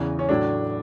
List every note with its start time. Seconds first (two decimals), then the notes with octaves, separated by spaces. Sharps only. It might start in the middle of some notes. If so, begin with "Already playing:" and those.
Already playing: E2 C#3 E3
0.19 C#4
0.29 A2 F#3 A3 D4